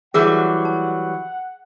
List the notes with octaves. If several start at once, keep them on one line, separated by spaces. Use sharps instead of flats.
E3 F#3 G3 G#4 A#4 E5 F#5
A5